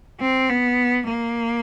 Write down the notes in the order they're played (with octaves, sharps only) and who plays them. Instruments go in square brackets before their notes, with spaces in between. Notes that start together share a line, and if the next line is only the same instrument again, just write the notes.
[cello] C4
B3
A#3